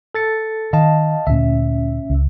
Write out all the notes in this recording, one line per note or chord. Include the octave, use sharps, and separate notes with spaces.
A4 A6 C#7
D#3 D#5 F5 A5
D2 A#2 C#4 E5
C#2